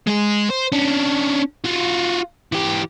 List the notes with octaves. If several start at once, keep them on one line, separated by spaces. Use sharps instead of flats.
G#3 G#4
C5
C#4 D4
F4 F#4
E3 G4